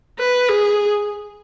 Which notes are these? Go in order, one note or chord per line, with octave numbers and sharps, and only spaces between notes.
B4
G#4